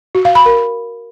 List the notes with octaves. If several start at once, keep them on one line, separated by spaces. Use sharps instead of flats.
F#4
F5
B5
A#4